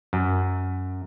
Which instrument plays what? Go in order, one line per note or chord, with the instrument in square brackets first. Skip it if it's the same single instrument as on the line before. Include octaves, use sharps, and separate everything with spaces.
[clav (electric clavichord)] F#2